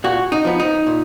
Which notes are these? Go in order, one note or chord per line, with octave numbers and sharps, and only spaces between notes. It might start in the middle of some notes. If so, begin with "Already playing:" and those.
A#2 F#4
D#4
F3 B3
D#4
A#2